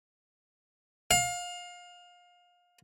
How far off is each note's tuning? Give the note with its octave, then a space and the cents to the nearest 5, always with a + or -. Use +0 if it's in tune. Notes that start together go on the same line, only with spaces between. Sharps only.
F5 +25